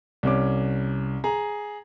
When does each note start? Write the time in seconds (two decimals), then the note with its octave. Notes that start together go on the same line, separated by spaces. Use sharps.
0.23 C2 C#4 D6
1.24 G#4 A#5